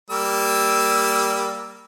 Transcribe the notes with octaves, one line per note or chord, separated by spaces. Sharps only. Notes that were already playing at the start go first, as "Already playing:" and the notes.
G3 A#3 E6